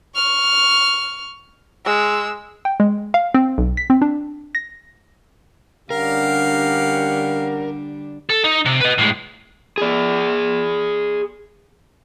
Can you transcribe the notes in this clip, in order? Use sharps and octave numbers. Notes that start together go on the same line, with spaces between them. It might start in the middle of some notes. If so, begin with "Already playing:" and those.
C#6 F6
G#3 E6
G5
G#3
F5
C4
B1
B6
C4
D4
A#6
D3 G3 C#4 D4 G4 A#4 F5 F#5
A4
D#4
C3
B4 D#5
A2 G#3
G#4 D5